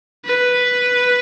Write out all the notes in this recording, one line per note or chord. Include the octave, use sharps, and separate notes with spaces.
B4